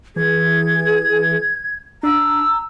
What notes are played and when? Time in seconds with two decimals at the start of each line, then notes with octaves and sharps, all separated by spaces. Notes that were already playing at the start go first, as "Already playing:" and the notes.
0.16 E3 G#4 G#6
2.03 D4 A#5 E6